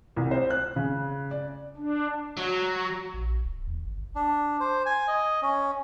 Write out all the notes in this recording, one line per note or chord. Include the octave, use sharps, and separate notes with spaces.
C2
C5
F#6
C#3
D5
D4
F#3
A#1
D1
D#2
G1
D4
C5
G#5
D#5
C#4